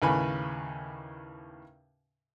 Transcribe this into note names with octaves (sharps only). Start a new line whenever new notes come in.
D#2 A2 C#3 B4 G#5 B5